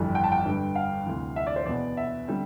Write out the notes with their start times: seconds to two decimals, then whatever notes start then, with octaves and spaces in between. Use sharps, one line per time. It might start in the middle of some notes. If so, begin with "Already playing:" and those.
Already playing: G1 F2 E3 G3
0.15 G5
0.24 A5
0.32 G5
0.45 G2 D3 G3
0.76 F5
1.06 D2 C3 E3
1.36 E5
1.47 D5
1.56 C5
1.66 E2 B2 B3 D5
1.97 E5
2.28 D3 G3 C4